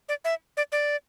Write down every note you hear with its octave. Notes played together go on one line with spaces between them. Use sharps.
D5
E5
D5
D5